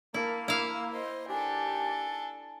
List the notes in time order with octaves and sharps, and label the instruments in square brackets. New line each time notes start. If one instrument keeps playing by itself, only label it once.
[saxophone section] A#3 [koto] E4 [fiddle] A5
[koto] E4 F5 [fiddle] E6
[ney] C5 [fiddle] D#5 C6
[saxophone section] D#2 G4 [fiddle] D4 A4 [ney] G#5